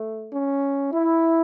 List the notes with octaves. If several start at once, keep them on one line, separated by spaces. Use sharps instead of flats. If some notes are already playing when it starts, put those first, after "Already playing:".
Already playing: A3
C#4
E4